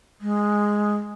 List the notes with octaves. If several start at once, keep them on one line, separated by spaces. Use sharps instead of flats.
G#3